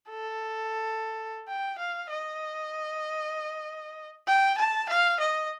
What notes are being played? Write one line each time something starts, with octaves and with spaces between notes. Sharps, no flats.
A4
G5
F5
D#5
G5
A5
F5
D#5